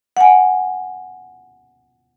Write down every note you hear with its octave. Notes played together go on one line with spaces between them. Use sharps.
F#5 G#5